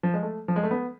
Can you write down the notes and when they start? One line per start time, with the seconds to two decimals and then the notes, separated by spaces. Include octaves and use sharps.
0.03 F3
0.14 G#3
0.23 A3
0.48 F3
0.56 G#3
0.63 A3
0.71 B3